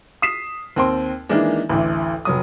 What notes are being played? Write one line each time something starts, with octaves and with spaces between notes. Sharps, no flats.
D#6 B6 C7 E7
D#2 C4 G5 C6
D#3 E3 G#3 A#3 D4
A1 D2 E3
F1 F#3 D#6